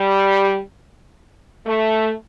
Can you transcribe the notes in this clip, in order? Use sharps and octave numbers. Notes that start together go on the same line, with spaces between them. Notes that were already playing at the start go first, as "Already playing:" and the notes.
Already playing: G3
A3